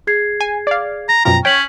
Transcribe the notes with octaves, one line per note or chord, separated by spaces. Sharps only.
G#4 G#6 C7
G#5
D5 F5
A#5 A#6
F#2 B2 F3 G5 A#5
C#4 C#5 G5 G#6 B6 F#7